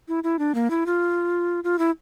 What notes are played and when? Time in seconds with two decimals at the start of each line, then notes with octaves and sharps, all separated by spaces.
0.08 E4
0.24 E4
0.39 D4
0.55 A#3
0.70 E4
0.86 F4
1.64 F4
1.79 E4